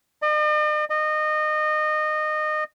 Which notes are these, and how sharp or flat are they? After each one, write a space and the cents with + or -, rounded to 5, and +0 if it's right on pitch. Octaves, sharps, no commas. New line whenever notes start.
D#5 -45
D#5 -25